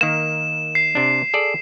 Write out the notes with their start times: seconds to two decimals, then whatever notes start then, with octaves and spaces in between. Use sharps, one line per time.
0.01 D#3 A#3 E7
0.75 C7
0.95 C3 D4
1.34 G#4 A4 D5